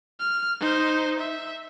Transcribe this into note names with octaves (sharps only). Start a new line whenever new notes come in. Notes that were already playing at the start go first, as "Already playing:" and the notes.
F6
D#4 C5
E5